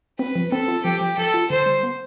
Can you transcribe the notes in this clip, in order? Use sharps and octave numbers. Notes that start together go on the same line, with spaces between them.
C4 B4
F3
C4 A4
F4
F3 G4
F3
F3 A4
F4
D3 C5
G3
B3